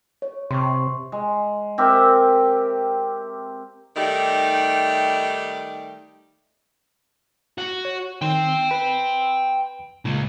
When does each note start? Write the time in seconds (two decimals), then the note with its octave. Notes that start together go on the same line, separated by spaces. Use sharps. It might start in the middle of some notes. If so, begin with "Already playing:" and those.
0.22 C#5
0.51 C3 C6 C#6
1.12 G#3
1.78 C4 G4 A#4 E5
3.96 D#3 G3 A3 D#4 G4 D5
7.58 F#4
7.85 C#5
8.22 D#3 G5 C6
8.71 B4 B5
10.05 C#2 A#2 C#3